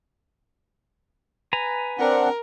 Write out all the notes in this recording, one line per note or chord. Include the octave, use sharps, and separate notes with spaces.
B4 G#5 A#5
C4 D4 A#4 F#5